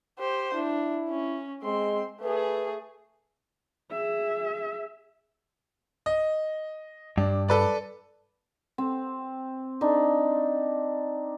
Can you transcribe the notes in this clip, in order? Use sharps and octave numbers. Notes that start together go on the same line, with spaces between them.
G4 C5
D4 E4
C#4
G#3 C4 C6
A3 G#4 B4
G#4 E5
D#5
G2 D4
A4 B4 D5
C4
D4 D#4